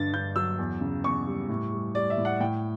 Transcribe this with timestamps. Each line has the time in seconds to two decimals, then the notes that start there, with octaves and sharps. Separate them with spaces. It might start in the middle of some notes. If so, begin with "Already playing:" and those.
Already playing: G2 D3 A6
0.13 G2 G6
0.36 F#3 E6
0.59 E2
0.81 C#3
1.04 E2 C#6
1.27 G3
1.49 A2
1.72 G3
1.95 G3 D5
2.10 E5
2.18 A2
2.25 F#5
2.40 A2 G5